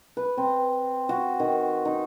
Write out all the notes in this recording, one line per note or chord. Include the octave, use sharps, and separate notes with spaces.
B4
C4
F#4
D#3
D#4